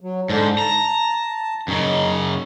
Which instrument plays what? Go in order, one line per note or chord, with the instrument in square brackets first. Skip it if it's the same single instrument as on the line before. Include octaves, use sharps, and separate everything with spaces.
[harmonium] F#3
[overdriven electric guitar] G#2 [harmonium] D3 D4 C5
[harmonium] A5 [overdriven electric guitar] A#5
[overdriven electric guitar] F#2 C#3 [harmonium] D#4